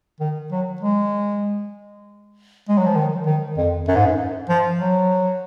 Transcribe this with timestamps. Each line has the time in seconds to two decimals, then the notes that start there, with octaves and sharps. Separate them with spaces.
0.21 D#3
0.52 F#3
0.81 G#3
2.69 G#3
2.78 F#3
2.87 F3
2.96 D#3
3.26 D#3
3.58 F2
3.88 F#2
3.96 G#2
4.06 F#2
4.49 F3
4.80 F#3